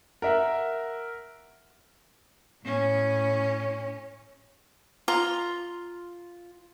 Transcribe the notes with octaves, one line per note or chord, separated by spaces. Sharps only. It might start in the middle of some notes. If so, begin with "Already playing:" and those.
A#4 E5 F#5
A2 C#4
F4 A#5 C6